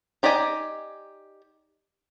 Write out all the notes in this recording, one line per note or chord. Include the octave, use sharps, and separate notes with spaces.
D#4 G4 D5 D#5 G#5